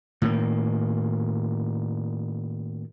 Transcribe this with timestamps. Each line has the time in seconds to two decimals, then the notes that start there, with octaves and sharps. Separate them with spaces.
0.22 A2 D#3 A#3